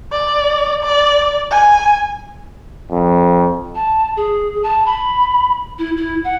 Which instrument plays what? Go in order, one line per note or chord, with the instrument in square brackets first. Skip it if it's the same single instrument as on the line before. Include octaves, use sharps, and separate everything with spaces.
[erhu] D5
D5
G#5
[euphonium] F2
[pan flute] A5
G#4
A5
B5
E4
E4
F#5